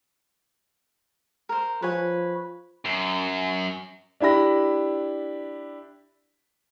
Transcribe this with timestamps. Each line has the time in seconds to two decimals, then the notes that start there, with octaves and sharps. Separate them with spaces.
1.49 A#4 C5
1.82 F3 B4 C#5 G#5
2.85 F#2
4.20 D4 E4 G4 B5 A#6